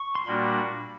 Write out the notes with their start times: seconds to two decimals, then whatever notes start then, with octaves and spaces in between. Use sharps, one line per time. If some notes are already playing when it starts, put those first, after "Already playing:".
Already playing: C#6
0.15 C6
0.26 A#2 G3 A#3 D4 F#4 B5